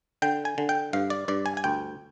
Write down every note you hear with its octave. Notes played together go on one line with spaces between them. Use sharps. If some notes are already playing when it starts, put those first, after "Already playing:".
D3 G5
G#5
D3
G5
G2 F5
D5
G2 D5
G#5
G#5
D2 G5